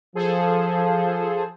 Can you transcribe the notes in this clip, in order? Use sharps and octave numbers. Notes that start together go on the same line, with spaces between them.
F3 G#4 A4 C5